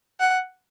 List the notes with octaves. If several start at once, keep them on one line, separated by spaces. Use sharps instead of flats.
F#5